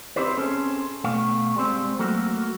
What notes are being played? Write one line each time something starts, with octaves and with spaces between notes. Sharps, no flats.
C4 D4 E4 G4 B4 C5
C4 C#4 G#4 A4
B2 A3 F5
G3 G#3 C4
F#3 A3 A#3 F#4